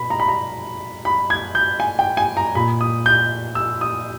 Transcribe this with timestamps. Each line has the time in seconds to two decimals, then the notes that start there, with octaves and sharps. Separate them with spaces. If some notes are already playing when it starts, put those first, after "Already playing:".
Already playing: B2 B5
0.10 A#5
0.20 B5
0.28 A#5
1.05 B5
1.30 G#6
1.55 G6
1.80 G#5
1.99 G5
2.17 G#5
2.37 A#5
2.55 A#2 B5
2.81 D#6
3.06 G6
3.55 E6
3.81 D#6